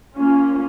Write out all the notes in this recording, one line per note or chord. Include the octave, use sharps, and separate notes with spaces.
A#3 C#4 F4